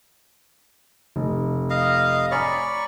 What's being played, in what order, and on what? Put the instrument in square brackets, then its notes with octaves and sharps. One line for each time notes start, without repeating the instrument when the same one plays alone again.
[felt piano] F1
[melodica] D#5 F5
[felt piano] C#5 G#5 A#5 [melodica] D5 B5 C#6